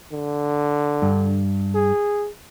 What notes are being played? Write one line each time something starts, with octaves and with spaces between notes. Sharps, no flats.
D3
G2
G#4